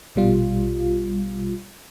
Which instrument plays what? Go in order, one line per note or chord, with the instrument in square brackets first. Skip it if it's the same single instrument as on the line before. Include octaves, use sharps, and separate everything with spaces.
[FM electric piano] A#1 B2 G3 F4